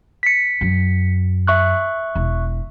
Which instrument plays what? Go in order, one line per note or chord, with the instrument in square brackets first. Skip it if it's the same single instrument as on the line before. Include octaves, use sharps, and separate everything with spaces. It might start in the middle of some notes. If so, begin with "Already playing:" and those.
[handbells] B6 C#7
[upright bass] F#2
[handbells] E5 C#6 F#6
[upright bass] E1